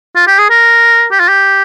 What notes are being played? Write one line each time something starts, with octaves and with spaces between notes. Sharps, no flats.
F4
G4
G#4
A#4
G4
F4
G4